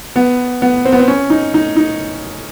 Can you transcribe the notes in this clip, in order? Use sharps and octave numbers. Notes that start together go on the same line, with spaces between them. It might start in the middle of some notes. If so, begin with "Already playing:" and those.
B3
B3
C4
B3
C4
C#4
D#4
D#4
D#4